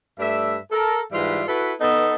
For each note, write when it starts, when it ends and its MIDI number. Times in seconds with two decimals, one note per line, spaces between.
0.19 0.55 43
0.19 0.55 57
0.19 0.55 74
0.19 0.55 76
0.71 1.01 69
0.71 1.01 70
1.12 1.42 44
1.12 1.42 52
1.12 1.42 55
1.12 1.42 65
1.12 1.42 71
1.12 1.42 76
1.47 1.73 64
1.47 1.73 66
1.47 1.73 69
1.47 1.73 71
1.80 2.15 59
1.80 2.15 63
1.80 2.15 69